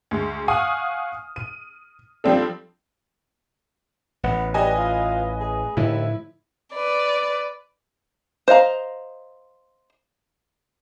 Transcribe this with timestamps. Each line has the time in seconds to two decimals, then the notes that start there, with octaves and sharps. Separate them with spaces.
0.11 D2 G#3
0.48 F5 F#5 G#5 C#6 D#6 F6
1.36 D#7
2.24 F3 G3 C4 D4 A4
4.23 A1 B3
4.54 G3 B4 D#5 G#5
4.78 F4
5.40 G#4
5.77 D#2 A2 D3 F3 E4
6.74 B4 D5
8.48 C5 D#5 F5 A#5